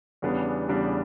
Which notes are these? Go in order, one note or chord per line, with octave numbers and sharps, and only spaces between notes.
E2 C#3 G3 B3 D4
E2 C#3 G3 B3 D4